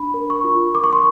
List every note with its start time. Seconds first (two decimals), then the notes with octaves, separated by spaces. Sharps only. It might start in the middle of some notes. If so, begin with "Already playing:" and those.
Already playing: D4 B5
0.14 A#4
0.30 C#6
0.44 F4
0.75 A#4 D6
0.84 C#6
0.93 C6